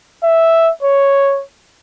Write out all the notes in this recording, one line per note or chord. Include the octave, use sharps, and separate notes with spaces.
E5
C#5